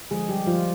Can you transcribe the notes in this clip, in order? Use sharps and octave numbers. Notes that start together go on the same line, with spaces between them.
D3 F3 G#3 G#4
G3 G4
F3 F4